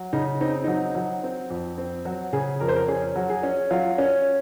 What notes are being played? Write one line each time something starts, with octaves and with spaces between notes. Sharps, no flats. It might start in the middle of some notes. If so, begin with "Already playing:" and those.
Already playing: F#3
C#3 D#4
C4 D#4
F#3 D#4
F#3
C4
F2
C4
F#3 F#4
C#3 G#4
F2 A#4
C5
A#4
C#4 G#4
F#3
G#4
C#4
F#3 F4
C#4